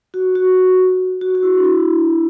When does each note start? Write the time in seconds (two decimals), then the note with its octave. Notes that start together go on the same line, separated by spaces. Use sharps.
0.14 F#4
0.35 F#4
1.21 F#4
1.35 F#4
1.43 E4
1.58 D4
1.64 E4